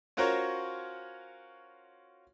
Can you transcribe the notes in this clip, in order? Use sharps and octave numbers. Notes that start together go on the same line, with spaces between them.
C#4 F4 F#4 A#4 C5 C#5